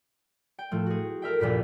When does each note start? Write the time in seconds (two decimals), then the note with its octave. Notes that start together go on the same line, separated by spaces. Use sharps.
0.59 G5
0.71 A2 F3 A3
0.86 F#4 G#4
1.22 A4 A#4 E5 G5
1.40 A#1 E2 G2 A#2 B6